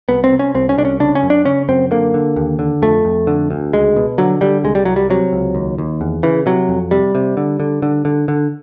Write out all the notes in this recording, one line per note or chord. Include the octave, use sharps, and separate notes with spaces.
C2 B3
C4
C3
C#4
C2 C4
C#4
C2 D4
C#4
C#3 D4
C#4
F#2
D4
C#3 C#4
F#2 C4
D3 A#3
D3
D#2
D3
F2 A3
F2
D3
D2
C#2 G#3
B2
D3 F#3
D3 G3
C2 G#3
G3
C2 F#3
G3
C3 F#3
C#2
D#2
D#2
E2
C#3 E3
C3 F#3
F2
C3 G3
C3
D3
D3
D3
D3
D3